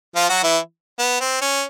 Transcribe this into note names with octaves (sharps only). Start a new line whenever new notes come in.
F3 F4
F#3 F#4
E3 E4
B3
C4
C#4